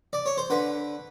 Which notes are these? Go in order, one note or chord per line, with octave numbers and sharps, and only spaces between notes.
D5
C#5
C5
D3 B4